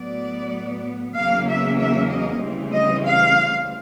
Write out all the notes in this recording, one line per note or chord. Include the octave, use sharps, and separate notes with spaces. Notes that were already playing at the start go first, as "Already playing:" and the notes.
Already playing: A2 F#3 B3 D5
E2 C#3 F#3 A#3 C#4 F5
E5
E5
D#5
D2 C#3 E3 G3 C4
D#5
F5